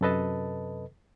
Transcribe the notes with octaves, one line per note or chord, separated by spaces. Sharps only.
F#2 C3 A4 B4 D#5 A5